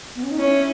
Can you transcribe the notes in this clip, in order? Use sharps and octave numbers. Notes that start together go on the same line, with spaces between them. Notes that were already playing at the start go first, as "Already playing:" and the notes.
B3
C#4
D#4
C#4 E4